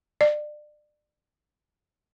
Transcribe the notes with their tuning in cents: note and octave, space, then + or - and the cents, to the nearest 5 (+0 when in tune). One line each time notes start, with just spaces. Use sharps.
D5 +30